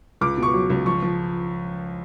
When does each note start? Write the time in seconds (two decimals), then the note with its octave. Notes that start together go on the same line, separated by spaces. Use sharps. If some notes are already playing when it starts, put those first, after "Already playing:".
0.21 C#2 D6
0.38 B2 C#6
0.54 F#3
0.70 C#2
0.86 F3 C#6
1.02 F3